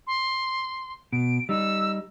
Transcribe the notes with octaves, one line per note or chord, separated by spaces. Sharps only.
C6
B2 D7
G3 D#4 E6